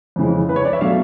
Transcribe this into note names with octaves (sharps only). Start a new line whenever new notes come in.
F2 C#3 E3 G#3
B4
C#5
D5
E5
B2 F#3 A3 F5